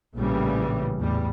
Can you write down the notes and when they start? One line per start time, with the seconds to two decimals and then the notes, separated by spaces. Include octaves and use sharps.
0.16 A#1 A2 C#3 E3 G3
1.00 E2 A2 G3